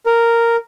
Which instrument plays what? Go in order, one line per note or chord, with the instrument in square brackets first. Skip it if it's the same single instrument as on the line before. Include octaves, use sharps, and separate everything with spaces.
[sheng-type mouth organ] A#4